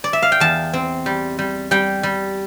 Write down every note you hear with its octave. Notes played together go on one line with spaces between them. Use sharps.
D5
E5
F5
G5
E2 A5
C4
G3
G3
G3 G5
G3